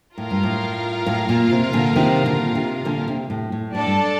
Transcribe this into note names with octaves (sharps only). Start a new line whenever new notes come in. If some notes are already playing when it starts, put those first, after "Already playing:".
A2 F4 A#4 F5
G2
A2
A2
A#2
C3
A#2 D3
C3 D#3
A#2 D3
C3
A#2 D3
C3
A2
A2
A2 D4 A4 D5 A5
G2